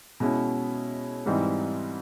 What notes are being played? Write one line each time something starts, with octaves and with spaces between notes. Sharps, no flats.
B2 G#3 C#4 E4
G#2 E3 G3 C4 D#4